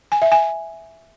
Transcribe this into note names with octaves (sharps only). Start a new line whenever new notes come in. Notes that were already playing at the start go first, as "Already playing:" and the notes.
G#5
E5
G#5